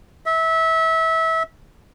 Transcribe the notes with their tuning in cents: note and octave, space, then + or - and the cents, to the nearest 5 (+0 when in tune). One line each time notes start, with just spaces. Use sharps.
E5 -25